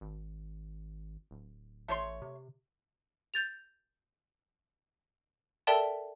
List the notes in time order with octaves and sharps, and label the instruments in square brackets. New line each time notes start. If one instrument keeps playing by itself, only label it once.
[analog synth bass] G#1
D1
[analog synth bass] A1 [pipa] A3 C#5 C6
[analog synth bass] C3
[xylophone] G6 A6 F7
A4 A#4 D5 E5 G5 A5